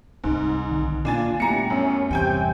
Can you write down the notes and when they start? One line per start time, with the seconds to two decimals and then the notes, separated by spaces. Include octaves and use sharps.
0.24 D1 C2 G#2 C3
0.70 B1 D3 D#3
1.05 A#2 A#3 D4 F4 G#5 A6
1.40 G3 A3 B3 E4 G4 G#5 A#5 C#7
1.70 F#2 C#4
2.11 E2 G2 C3 E3 G5 G#5 G6